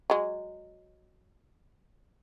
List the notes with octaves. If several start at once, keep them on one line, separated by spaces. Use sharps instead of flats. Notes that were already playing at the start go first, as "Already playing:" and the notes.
F#3 G#3